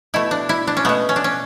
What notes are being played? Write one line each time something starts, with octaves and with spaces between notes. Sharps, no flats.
B2 A3 E4
D4
E4
D4
C#4
B2 A3 B3
C#4
D4
C#4